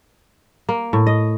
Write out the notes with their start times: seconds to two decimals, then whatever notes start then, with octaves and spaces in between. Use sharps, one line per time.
0.69 A#3
0.93 A2
1.07 D#5